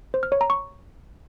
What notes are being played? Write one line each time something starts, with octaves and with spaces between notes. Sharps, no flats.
C5
F6
C#5
A#5
C#6